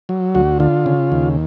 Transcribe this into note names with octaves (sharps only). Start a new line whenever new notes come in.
F#3
D2 F#4
D3 F4
C#3
D#2